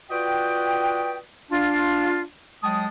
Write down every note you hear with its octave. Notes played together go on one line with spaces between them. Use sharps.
F4 F#4 B4 D5 D#5 G5
D4 F4
F#3 G#3 G5 A5 D#6